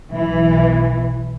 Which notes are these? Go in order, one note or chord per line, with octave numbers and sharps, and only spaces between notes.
B1 E3